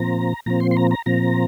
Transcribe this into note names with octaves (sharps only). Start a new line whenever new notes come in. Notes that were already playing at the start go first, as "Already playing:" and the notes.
Already playing: A#2 F3 C4 A#5
A#2 F3 C4 A#5
C6
C6
A#5
A#5
A#2 F3 C4 A#5